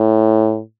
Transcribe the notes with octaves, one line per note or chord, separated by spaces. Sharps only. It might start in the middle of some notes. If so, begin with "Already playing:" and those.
Already playing: A2